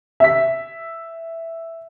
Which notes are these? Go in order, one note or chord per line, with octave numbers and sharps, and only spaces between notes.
E5 B6